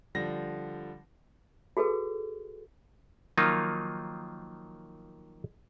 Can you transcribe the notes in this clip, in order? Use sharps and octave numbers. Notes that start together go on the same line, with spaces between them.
D3 F3 G3 A#6
F#4 G#4 A4 B4
D#3 F3 F#3 A#3 D#4 F4